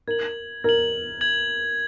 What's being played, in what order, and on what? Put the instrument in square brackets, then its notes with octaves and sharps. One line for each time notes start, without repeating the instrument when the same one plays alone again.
[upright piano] A#4 [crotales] G#6 F#7
[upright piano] A#4 [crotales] G#6 F#7
[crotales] G#6 F#7